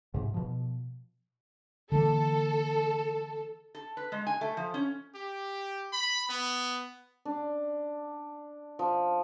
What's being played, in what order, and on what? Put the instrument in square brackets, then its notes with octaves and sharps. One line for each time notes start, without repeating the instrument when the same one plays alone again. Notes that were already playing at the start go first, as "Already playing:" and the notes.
[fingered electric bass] G#2 C3
B2 F3
[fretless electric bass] D3 E3 A#3 [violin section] A4
[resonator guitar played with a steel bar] A4
B4
G#3
G#5
A3
F3
C#4
[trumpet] G4
B5
B3
[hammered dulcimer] D4
F3